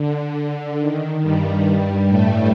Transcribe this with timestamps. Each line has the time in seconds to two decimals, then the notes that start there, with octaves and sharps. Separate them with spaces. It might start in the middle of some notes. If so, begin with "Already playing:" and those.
Already playing: D3
0.79 D#3
1.22 G2 G3
2.08 A2 A3